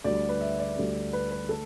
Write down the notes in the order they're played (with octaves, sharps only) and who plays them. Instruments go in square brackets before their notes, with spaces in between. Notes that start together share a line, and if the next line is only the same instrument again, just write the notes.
[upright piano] D2 D3 G3 D5
B4
E5
D5
D2 D3 G3
B4
B4
D3 A3 A4